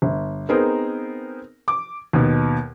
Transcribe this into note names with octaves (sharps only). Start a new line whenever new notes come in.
G1
B3 C4 D#4 G#4 A#4 C5
D6
D#2 B2